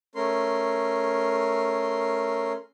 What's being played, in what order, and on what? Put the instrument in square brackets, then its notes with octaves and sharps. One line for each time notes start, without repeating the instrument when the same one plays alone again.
[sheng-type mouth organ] A3 C#4 A#4 C6